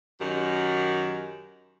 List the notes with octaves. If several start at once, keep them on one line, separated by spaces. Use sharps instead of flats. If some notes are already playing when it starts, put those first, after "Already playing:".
F#2 D#3 F#4 G4